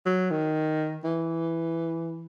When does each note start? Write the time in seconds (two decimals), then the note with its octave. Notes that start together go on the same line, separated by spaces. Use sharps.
0.06 F#3
0.31 D#3
1.04 E3